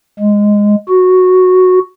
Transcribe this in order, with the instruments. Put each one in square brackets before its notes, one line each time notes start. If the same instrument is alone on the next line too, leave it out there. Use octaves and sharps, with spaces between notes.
[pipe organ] G#3
F#4